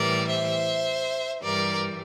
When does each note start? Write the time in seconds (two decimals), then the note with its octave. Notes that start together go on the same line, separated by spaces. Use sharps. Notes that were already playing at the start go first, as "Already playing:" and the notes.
Already playing: A2 E3 G3 A#4 D5
0.29 C5 E5
1.42 G2 E3 G3 A#4 D5